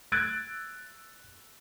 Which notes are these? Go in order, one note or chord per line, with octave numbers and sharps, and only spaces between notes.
E6 F#6 G#6 A6 D7